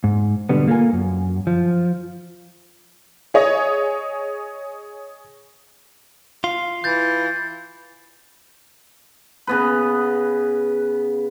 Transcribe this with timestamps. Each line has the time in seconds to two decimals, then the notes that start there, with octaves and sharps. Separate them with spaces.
0.04 G#2
0.49 B2 D3 G3 B3
0.68 A#3 F4 G4 A4 A#4 G#5
0.93 F#2
1.47 F3
3.34 G#4 C#5 D#5
6.44 F4 C7
6.84 E3 G6 A6
9.47 C#3 B3 B4